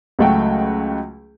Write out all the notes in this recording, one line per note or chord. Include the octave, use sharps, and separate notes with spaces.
C#2 F#3 A3 F#4 G5